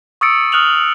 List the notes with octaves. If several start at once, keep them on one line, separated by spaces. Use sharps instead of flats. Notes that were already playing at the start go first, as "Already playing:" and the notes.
C#6 D#6 E6 A6 C#7 D7
D#6 F6 F#6 F7 F#7